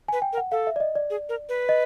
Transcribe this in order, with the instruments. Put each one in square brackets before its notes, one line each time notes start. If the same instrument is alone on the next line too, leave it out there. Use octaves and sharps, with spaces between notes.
[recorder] B4 [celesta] G#5
[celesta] G5
[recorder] A#4
[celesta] F#5
[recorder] A4 [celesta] F5
[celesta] E5
D5
D#5
D5
[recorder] G#4
A#4
B4
[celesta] D#5